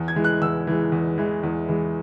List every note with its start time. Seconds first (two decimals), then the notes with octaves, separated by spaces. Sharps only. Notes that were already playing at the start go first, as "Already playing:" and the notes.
Already playing: E2
0.08 G#6
0.16 E3 G#3
0.24 F#6
0.42 E2 E6
0.67 E3 G#3
0.92 E2
1.18 E3 G#3
1.43 E2
1.68 E3 G#3